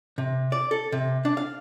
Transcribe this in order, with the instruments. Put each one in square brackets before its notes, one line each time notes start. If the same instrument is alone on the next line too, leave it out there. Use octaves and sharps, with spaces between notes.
[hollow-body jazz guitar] C3
D5
A4
C3
D4
F5